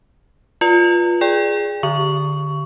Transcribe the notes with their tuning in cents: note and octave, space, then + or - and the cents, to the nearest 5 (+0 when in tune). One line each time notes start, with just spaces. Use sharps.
F4 +0 B4 -25 D5 +0
G#4 +0 D5 +0 G5 +30
D3 +5 C#6 +15